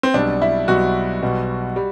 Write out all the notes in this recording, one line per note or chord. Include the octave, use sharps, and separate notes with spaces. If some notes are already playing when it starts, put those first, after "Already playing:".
C4
B1 B2 G3 D4
E4
B1 B2 G3 F#4
B1 B2 G3
G3